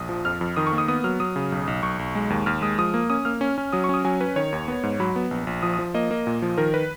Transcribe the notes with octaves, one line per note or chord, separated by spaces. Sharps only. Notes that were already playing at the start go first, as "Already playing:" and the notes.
Already playing: A#1 D#6
F3
F2 F6
F2
D#3 D#6
C#6
A#3
D#6
B3 D#6
F#3 F6
F#3 D#6
C#3
B1
B1
B1 C#6
B1
G#3
D#2
D#2 F6
G#3 D#6
F3 D#6
A#3
C#4 D#6
A#3 F6
C#4
C#4
F#3 D#6
C#6
C#4 D#6
F#3 G#5
C#4 B4
D#3 C#5
D#2
B3
G#2
F#3 B5
B3
A#1
A#1
F3 D#6
D#6
F3
A#3 D#5
A#3
A#2
F3
D#3 A#4
B4